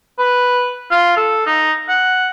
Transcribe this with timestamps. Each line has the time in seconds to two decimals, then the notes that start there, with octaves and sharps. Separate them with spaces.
0.19 B4
0.91 F4
1.17 A4
1.46 D#4
1.88 F#5